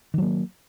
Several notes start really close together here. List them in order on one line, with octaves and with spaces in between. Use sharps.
D#3 F#3 A#3